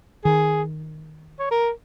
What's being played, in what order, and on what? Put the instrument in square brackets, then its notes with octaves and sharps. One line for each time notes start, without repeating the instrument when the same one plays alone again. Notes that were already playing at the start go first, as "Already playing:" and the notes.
[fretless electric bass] D#3 [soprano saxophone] G#4
[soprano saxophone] C#5
A#4